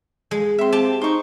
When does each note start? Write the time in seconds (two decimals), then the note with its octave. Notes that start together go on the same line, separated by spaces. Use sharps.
0.31 G#3
0.59 C4 E5 C6
0.73 G4 A5
1.02 D#4 C5 C#6